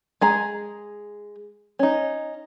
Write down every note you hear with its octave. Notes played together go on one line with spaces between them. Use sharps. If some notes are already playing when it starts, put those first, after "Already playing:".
G#3 G#4 A#5
C#4 D#4